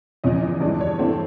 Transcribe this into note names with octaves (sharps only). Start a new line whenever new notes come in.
E2 C#3 F3 D#5
D#5
G2 E3 G#3 D5
C#5
G2 E3 A3 C4 C5